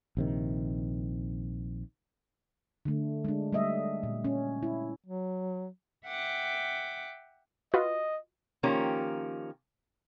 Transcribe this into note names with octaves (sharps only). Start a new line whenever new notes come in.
A#1 C3 D#3
D3 A3
G#3 D4
G3 A3 D#5 E5
A#2
C#4
E4
F#3
E5 F#5 G5 D6
F4 F#4 B4 D#5
D#3 F3 A#3 C#4 G4